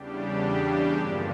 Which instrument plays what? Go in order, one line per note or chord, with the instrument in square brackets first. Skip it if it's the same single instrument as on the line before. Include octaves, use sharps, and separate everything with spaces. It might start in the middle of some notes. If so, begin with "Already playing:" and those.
Already playing: [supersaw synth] E2 C#3 G3 D4 G4
G2 D3 F3 A#3